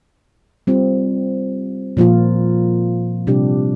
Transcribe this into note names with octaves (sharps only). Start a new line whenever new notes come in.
G3 C4 F4
A#2 F3 A#3 F4
C3 G3 D4 G4